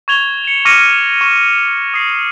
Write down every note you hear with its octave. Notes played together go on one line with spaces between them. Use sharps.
C#6 G#6 F7 G7
C#7 E7
C#6 D6 F6 A#6 C#7 D#7
C#6
D#6 C7